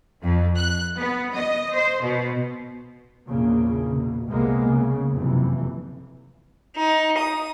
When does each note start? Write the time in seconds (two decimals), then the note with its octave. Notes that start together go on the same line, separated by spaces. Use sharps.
0.22 F2
0.57 F#6
0.98 B3
1.34 D#5
1.74 C5
2.03 B2
3.28 A#1 E2 C#3 A#3
3.96 B2
4.29 C2 C3 G#3 A#3 B3
4.67 C#3
5.14 F#1 F2 C3 E3
6.75 D#4
7.18 D#6